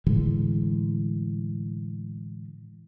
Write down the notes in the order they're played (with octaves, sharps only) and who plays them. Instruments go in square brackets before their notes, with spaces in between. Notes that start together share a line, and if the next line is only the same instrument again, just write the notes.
[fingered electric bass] A2 D3 E3 G#3